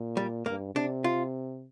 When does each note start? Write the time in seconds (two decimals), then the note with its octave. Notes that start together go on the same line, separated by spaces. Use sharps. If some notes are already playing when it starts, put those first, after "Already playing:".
Already playing: A#2
0.17 G3
0.46 G2 A#3
0.75 C3 D4
1.04 F4